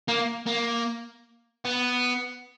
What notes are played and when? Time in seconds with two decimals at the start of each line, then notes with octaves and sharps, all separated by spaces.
0.08 A#3
0.46 A#3
1.65 B3